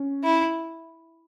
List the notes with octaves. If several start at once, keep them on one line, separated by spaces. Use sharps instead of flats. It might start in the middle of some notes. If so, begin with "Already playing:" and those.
Already playing: C#4
E4